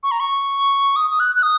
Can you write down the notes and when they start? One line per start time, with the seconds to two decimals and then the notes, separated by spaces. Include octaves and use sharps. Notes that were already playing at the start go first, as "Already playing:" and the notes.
0.03 C#6
0.11 A#5
0.20 C#6
0.96 D#6
1.10 D#6
1.20 F#6
1.36 F#6
1.43 D#6